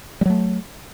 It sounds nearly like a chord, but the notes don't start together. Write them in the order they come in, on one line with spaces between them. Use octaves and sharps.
G3 F#3 A3